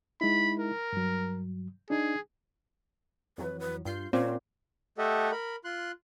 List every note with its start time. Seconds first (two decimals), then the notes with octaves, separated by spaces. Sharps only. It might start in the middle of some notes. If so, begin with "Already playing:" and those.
0.21 G#3 D#4 E4 B5
0.60 A#4
0.93 G2 F#3
1.90 D4 D#4 G#4
3.38 F2 E3 F#3 B4
3.60 B4
3.85 G2 F4 G6 C7
4.13 A#2 C4 C#4 C#5
4.98 A3 G4 A4 D#5 E5 F#5
5.32 A#4 B5
5.64 F4 C6 F#6